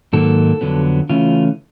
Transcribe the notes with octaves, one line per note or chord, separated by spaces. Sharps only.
G#2 D#3 F#3 A#3 A4
F2 D3 F#3 B3
C#3 E3 A3 C#4 F4